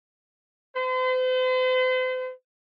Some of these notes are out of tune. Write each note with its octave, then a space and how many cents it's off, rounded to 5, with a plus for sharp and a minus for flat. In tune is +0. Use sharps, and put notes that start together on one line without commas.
C5 -40